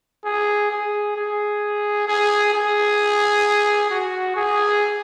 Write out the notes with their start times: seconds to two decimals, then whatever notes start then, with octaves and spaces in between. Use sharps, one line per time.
0.25 G#4
0.71 G#4
1.16 G#4
2.08 G#4
2.54 G#4
3.90 F#4
4.36 G#4